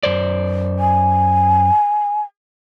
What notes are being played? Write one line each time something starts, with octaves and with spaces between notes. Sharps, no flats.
F#2 C5 D5
G#5